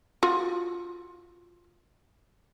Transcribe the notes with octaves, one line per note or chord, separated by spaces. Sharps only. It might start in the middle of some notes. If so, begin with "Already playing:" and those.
F4 F#4